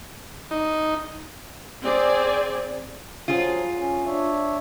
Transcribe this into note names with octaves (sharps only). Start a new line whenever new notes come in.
D#4
C4 G#4 D5
F3 F#3 F4 G#4
C#4
D4 C#5 E5